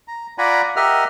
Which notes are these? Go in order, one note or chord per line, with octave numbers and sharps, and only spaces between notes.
A#5
F4 D5 F#5 G#5 A#5 B5
G4 A#4 D#5 E5 F#5 F6